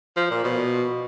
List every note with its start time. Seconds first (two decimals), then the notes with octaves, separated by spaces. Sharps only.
0.17 F3
0.30 A#2
0.44 B2